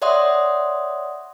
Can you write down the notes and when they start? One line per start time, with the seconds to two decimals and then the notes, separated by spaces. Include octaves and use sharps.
0.02 C#5 D5 E5 F#5 C6 D#6